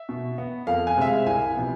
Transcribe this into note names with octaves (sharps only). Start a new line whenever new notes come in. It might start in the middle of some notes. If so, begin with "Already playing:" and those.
Already playing: E5
B2
B3
F2 F5
G#5
C3 G#3 C4 E5
F5
C2 G#5
C3 F3 B3